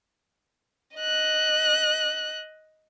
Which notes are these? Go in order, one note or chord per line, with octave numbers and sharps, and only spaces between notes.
D#5 F#6